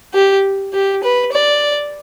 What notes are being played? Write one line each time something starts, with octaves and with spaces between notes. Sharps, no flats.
G4
G4
B4
D5